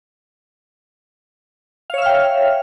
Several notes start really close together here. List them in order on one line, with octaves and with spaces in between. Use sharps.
F5 C#5 E5 F6 G5